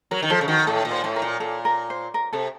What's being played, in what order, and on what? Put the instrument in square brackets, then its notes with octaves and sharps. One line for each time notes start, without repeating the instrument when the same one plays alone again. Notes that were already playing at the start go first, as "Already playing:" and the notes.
[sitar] F#3 [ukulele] A#4
[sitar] D#3
[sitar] F3 [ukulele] A4
[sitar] C#3
[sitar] D#3 [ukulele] F#4
[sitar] A2 [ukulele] A4
[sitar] A#2
[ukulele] C5
[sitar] A2
[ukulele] A#4
[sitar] A#2
[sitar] A#2 [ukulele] A4
[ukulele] A#4
C5
A#4
[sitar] C3 [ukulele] A4